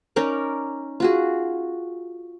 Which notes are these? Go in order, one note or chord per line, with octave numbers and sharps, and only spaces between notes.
C#4 D#4 A#4 D5
F4 F#4 G#4